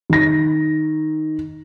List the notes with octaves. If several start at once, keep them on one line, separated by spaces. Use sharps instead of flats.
D#3 A#6